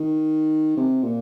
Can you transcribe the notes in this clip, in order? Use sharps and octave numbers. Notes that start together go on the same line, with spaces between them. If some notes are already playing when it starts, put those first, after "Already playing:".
Already playing: D#3
C3
A#2